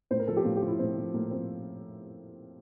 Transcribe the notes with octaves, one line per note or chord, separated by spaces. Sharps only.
A2 C5
A#4
F3 A4
G4
A2 F4
G4
F3
E4
A2 C4
F3
A2 A#3
F3 C4